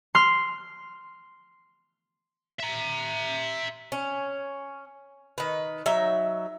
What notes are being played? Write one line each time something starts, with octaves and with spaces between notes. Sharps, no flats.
C6 F6
E5 A#5
C#4
D#3 B4
F#3 D#4 E5